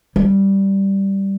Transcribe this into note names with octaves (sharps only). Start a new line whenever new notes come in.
G3